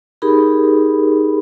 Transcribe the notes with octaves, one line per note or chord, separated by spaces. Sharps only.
D#4 G4 G#4 A#4 B5